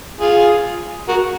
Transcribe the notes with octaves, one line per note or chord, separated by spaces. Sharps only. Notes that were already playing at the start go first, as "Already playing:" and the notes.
F4 G#4
F#4 A#4